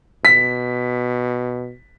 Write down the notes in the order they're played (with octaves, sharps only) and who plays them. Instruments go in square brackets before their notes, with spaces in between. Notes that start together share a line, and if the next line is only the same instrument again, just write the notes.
[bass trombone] B2 [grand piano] B6